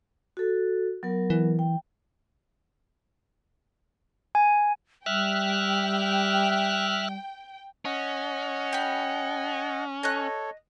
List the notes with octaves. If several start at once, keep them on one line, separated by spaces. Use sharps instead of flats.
F#4 A4
F#3 B3 A#4
E3
G5
G#5
G3 E5 G5 F6 F#6
C#4 D#5 F#5
G4 B5
A4 C#5 D#5 F#6